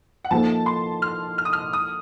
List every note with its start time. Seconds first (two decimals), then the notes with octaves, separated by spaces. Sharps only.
0.25 F#5
0.31 F3 A#3 D#4 A4 C5 A5
0.66 C6
1.02 F6
1.38 F6
1.45 D#6
1.53 F6
1.73 D#6